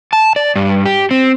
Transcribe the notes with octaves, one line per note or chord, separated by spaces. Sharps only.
A5
D5
G2
G4
C4